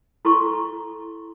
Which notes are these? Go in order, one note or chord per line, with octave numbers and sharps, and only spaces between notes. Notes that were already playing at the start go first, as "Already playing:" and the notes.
E4 A4 C6 C#6